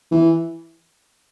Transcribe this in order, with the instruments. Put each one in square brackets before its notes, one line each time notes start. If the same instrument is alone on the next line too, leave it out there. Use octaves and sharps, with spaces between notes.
[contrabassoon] E3